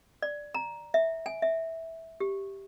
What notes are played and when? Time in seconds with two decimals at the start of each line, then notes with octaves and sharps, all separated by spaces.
0.22 D5
0.54 A#5
0.94 E5
1.26 G#5
1.42 E5
2.20 G4